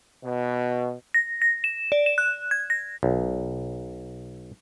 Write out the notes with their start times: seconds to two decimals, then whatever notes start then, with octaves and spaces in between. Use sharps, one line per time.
0.24 B2
1.14 A#6
1.42 A#6
1.64 E7
1.92 D5
2.06 E7
2.18 F#6
2.51 G#6
2.70 A#6
3.03 B1